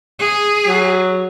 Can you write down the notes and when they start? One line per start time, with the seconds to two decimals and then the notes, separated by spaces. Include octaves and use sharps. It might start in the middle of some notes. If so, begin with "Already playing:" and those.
0.19 G#4
0.67 F#3